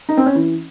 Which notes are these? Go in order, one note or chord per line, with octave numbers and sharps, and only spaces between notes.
D#4
C4
C#4
E3